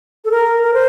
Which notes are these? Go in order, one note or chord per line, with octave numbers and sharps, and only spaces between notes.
A4
A#4
A#4
C5